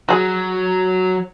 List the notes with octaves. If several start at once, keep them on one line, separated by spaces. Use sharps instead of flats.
F#3 F#4 G#4